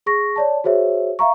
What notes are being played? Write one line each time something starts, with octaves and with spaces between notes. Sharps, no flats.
G#4 C#6 A#6
C#5 D5 A5
F#4 G#4 C5 C#5 E5
E5 F5 A#5 C#6